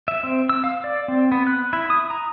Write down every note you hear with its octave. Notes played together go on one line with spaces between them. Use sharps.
E5
C4
E6
F5
D5
C4
B3
F#6
E4
D#6
A#5